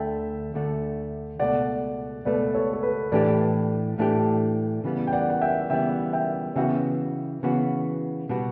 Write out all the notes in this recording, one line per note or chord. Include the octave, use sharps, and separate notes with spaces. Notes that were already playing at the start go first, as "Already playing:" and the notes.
Already playing: D2 D3 A3 D4 E5 G5
D2 D3 A3 D4
C#2 B2 A3 D5 F#5
C#2 B2 A3 B4 D5
A4 C#5
A4
B4
A2 E3 A3 D4 G4 B4 D5
A2 E3 A3 D4 G4
C#3 E3 G3 B3
G5
D5 F#5
F#5
E5 G5
C#3 E3 G3 B3 E5 G5
E5 G5
C#3 E3 B3 F#4 E5 G5
C#3 E3 B3 F#4
B2 G3 B3 F#4